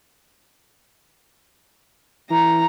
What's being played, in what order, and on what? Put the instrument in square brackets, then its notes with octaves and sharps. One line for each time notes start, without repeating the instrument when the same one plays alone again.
[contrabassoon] E3 [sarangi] A#5